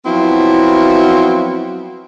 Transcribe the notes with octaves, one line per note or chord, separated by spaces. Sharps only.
F3 F#3 B3 C4 E4 F#4